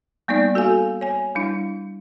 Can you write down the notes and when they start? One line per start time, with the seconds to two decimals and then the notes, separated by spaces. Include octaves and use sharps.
0.28 G3 A#3 B3 D#4 D5
0.55 F#4 A4 F5 G#5
1.01 C#5 G#5
1.35 G3 D4 E4